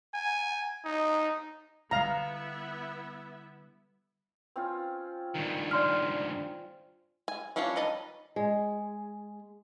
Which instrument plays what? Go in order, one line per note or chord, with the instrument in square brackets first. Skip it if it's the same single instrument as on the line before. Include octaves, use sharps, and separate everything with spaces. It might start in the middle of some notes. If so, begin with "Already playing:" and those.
[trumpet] G#5
D#4
[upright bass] D3 G3 [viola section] B3 E4 E5 [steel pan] F5 A#5
[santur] C4 C#4 F4
[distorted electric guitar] G2 D#3
[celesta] D5 C6 F6
[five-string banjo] G#5
G3 C#4 D4 F4 C#5
D#3 B4 D#5 A5
[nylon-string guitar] G#3